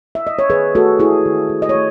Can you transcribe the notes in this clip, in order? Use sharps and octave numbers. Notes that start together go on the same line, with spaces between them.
E5
D#5
C#5
D#3 G#4 B4
A3 F#4 A4
A3 E4 G#4
D#3
D#3
D#5
C#5
A3